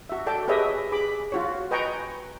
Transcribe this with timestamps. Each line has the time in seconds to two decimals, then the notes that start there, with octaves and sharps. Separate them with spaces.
0.09 F#4 E5
0.27 A4 D5 G5 A5
0.48 G4 G#4 B4 C#5 D#5 E5
0.92 G#4 B5 D6
1.32 F4 F#4 C#5
1.71 B4 D#5 G5 G#5 A#5 C#6